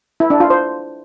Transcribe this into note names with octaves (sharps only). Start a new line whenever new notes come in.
E4
D4
F4
C5